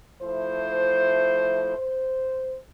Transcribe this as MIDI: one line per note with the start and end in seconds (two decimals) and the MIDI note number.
0.22 1.76 53
0.22 1.76 57
0.22 1.76 64
0.22 1.76 72
1.77 2.56 72